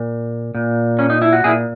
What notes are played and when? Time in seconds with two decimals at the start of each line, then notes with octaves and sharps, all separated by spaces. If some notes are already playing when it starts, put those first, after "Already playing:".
Already playing: A#2
0.55 A#2
0.99 C#4
1.10 D#4
1.22 E4
1.33 F#4
1.44 A#2 E4 G#4